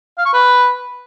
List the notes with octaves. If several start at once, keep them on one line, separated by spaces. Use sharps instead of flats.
F5
C#6
B4